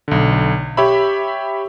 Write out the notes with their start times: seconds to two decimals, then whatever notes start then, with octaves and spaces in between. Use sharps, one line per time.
0.08 B1 D3
0.77 G4 C#5 E5 B5